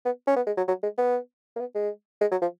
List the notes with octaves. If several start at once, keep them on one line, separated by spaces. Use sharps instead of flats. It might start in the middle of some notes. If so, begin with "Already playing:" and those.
B3
C#4
B3
G#3
F#3
F#3
G#3
B3
A#3
B3
G#3
G#3
F#3
F3